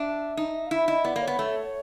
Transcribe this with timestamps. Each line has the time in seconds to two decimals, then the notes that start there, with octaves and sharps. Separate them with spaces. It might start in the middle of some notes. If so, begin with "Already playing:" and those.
Already playing: D4 E5
0.37 D#4
0.67 F5
0.71 E4 E5
0.88 E4 D#5
1.04 B3 D5
1.16 A#3
1.22 C#5
1.27 B3
1.39 A3